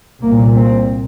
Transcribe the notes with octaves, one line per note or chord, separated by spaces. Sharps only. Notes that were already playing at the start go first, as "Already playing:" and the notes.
C2 A#2 A#3
C4